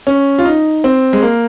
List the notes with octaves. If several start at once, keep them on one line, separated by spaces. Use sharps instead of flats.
C#4
F4
D#4
C4
G#3
A#3